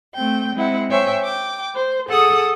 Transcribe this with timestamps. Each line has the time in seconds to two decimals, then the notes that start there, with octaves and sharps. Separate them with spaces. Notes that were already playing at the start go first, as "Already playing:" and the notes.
0.14 A3 C4 G5
0.54 G#3 C4 E4 F#5
0.90 C5 C#5 E5 G5 G#5
1.23 G5 D6
1.74 C5
2.08 G#4 A4 F#5 D#6